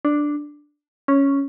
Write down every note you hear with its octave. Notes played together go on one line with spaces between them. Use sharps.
D4
C#4